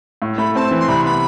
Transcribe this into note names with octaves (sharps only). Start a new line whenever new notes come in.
A2
A3 B5
C4 A5
E3
C6
C2 B5
B3 B5